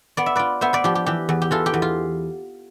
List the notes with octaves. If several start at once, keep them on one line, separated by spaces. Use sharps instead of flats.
B3 D5
E5
F4 B4 D5
B3 C5 E5
B4 D5
F3 G4
G4
E3 G4
E2
G4
E3 F4 A4
G4
E2
F4